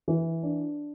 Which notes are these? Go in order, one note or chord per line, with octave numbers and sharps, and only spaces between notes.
E3
D4